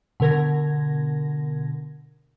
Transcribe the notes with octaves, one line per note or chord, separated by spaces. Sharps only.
B2 D3 A#4 G#6 A#6